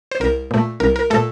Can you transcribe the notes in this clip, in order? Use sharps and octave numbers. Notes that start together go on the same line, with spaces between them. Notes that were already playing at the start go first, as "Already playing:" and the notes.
C5
C2 A#4
A#2 A3
C2 A#4
A#4
A#2 A3 A4